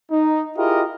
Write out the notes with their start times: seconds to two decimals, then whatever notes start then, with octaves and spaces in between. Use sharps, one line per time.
0.10 D#4
0.56 E4 F4 G4 G#4 A#4 D#5